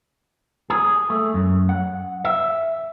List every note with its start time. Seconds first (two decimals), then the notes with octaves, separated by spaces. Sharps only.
0.70 G#4
1.10 A3
1.34 F#2
1.69 F#5
2.25 E5